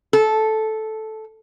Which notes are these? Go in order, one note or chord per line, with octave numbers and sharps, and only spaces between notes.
A4